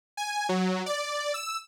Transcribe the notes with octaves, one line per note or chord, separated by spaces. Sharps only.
G#5
F#3
D5
E6